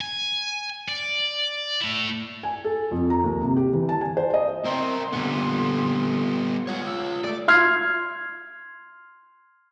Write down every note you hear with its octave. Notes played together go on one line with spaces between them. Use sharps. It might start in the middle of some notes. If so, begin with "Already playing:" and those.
G#5
D5
A3 E4
G#5
A4
F2
A#5
D#2
C3
G4
E3
A5
G#5
C5
D#5
C4 E4 A#4 C6
A#2 D3 G3 B3
G#3 F4 C#5 F#5
E6
A3 G#4 D5
C6 F6 G#6 C7